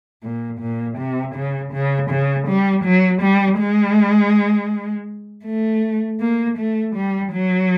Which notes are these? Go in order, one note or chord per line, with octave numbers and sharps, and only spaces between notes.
A#2
A#2
C3
C#3
C#3
C#3
G3
F#3
G3
G#3
A3
A#3
A3
G3
F#3